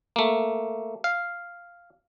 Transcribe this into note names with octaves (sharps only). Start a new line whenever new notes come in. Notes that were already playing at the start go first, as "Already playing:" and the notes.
A3 A#3
F5